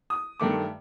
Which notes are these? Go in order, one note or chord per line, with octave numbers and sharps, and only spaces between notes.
D#6
G2 D#3 A3 D6